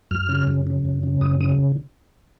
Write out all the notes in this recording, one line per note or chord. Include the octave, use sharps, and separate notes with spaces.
F#2 F6
C#3
F#2
C#3
F#2
C#3
F#2 D#6
C#3 D#6